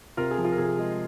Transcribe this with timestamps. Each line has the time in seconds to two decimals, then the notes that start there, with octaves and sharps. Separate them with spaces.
0.17 C3 F4 A#4
0.31 G#4
0.38 F3
0.44 F4
0.52 A#4
0.58 C3 G#4
0.78 G#3